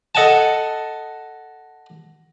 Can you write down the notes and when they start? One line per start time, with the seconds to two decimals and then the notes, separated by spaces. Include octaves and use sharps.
0.15 A4 D#5 F#5 G#5 A5